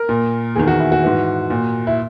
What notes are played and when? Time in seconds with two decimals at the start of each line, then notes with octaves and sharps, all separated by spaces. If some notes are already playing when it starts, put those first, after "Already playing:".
Already playing: A#4
0.09 A#2
0.55 E2 D#3 G#4
0.67 F#4
0.80 E4
0.92 F#4
1.03 G#2 E3
1.50 A#2
1.87 E4